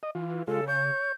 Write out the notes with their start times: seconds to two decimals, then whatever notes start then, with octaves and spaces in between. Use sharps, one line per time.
0.03 D#5
0.15 E3 F4
0.48 C#3 G#3 F4 A4
0.68 C#5 G6